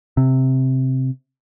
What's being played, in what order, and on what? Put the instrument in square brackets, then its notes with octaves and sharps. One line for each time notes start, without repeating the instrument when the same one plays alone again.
[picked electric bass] C3